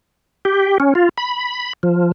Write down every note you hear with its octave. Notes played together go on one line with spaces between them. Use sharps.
G4
C#4
F4
B5
F3